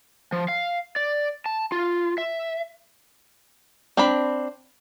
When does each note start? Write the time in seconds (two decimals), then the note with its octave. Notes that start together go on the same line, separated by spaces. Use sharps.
0.32 F3
0.48 F5
0.96 D5
1.46 A5
1.72 F4
2.18 E5
3.97 C4 D4 B5